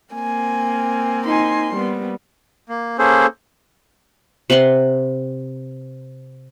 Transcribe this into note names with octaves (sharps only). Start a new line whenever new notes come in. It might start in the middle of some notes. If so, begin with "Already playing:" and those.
A#3 C4 G#5
D#4 G#5 C6
G3 B3
A#3
A#3 C#4 G#4 A4 C5
C3 B4 F#5 C6